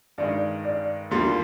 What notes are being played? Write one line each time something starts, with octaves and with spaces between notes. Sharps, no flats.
G2 D#3 G#3 D5
D5
D#2 D3 G3 A#3 F4 C6